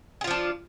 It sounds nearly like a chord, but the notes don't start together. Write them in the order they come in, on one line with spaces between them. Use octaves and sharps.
G#4 F4 F3 D4